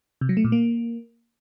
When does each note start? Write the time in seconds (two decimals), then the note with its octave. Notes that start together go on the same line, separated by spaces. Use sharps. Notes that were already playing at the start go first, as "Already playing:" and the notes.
0.21 C3
0.29 F#3
0.37 A3
0.45 A#2
0.52 A#3